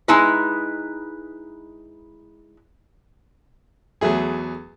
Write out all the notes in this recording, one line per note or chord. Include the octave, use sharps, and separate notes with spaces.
G#3 D#4 E4 B4
E2 F#3 A3 G#4